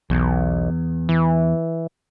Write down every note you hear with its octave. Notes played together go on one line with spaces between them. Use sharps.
B1 E2
E3